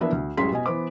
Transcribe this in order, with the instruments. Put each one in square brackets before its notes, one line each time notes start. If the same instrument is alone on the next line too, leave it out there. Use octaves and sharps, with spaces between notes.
[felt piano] E3 F3 A#3 B3 D4 E5
D2
A1 F#2 G3 G#3 C6 B6
B2 D#5 G#5
E3 B3 C5 D6